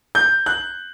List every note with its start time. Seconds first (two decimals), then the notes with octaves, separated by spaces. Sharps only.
0.15 G6
0.46 F#6